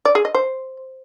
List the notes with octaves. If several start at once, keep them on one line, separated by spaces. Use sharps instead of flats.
D5
G#4
D#5
C5